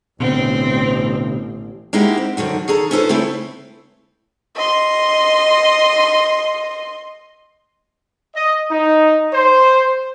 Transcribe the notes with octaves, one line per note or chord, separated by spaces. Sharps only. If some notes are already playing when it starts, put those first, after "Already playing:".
A1 B2 D3 C4
G#3 A#3 D#4 E4 F#4 G4
C4
F#2 D3 D#3 F#4
D#3 G#4 A4 A#5
C#4 D#4 F4 A4 B4 C5
C#3 A3 C4 E4 A4 B4
D#5 C6
D#5
D#4
C5